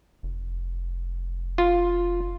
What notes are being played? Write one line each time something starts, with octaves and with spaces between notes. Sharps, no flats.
F1
F4